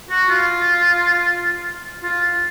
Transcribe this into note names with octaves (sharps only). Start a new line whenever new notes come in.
F#4
F4
F4